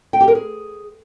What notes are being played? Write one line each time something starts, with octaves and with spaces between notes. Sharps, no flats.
G5
G4
A#4
G#4